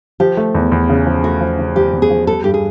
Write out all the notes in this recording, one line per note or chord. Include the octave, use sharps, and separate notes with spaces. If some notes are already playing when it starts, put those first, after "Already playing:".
F3 G4
A3
E2
E2
C#3
F3
A3 F#4
F3
C#3
F3 G4
E2
G#4
F3
G3 A4
G2 G4
G#4